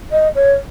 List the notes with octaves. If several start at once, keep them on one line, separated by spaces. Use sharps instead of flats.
D#5
C#5